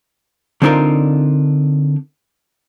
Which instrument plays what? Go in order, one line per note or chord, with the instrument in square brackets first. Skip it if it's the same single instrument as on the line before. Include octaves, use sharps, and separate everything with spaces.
[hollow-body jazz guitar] D3 C4 D4 D#4 F4 A#4